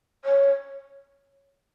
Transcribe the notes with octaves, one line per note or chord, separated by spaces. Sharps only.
C#5